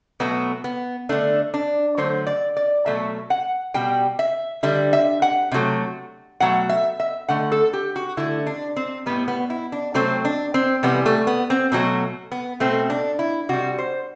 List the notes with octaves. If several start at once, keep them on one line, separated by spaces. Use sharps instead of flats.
B2 F#3 A3 B3
B3
D3 A3 D4
D4
D3 F#3 A3 C5
D5
D5
B2 F#3 A3 E5
F#5
B2 G3 G5
E5
D3 G3 E5
E5
F#5
C3 F#3 A3
B2 F#3 A3 F#5
E5
E5
D3 A3 F#5
A4
G4
F#4
D3 A3 E4
D4
C4
A2 G3 B3
B3
E4
D4
C3 F#3 A3 C4
D4
C4
C3 E3 G3 B3
A3
B3
C4
B2 F#3 A3 C4
B3
B2 A3 C4
D4
E4
C3 G3 F#4
C5